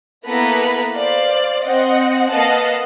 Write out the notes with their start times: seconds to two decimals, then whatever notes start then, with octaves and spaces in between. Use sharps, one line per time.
0.26 A#3 B3 E4 A4 B4 A#5
0.97 C5 D5 F5
1.63 C4 D#5 F#5
2.31 A#3 B4 D#5 F5 F#5 A5